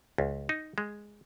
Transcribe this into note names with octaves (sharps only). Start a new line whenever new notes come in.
C#2
D#4
G#3